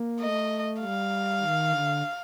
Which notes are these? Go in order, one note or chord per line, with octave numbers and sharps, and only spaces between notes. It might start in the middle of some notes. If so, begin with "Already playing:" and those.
Already playing: A#3
A3 D#5
G3 F5
D#3
D3